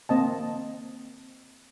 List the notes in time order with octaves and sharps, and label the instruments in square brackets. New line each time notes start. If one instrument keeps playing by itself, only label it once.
[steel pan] A#3 C4 D#5 A5